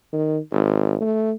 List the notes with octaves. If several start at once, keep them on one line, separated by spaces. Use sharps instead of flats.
D#3
G#1
A3